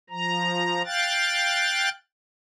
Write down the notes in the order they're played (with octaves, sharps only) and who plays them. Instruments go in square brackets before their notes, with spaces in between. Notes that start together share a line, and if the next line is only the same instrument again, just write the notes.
[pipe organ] F3 A#5
F5 G5 F#6 A6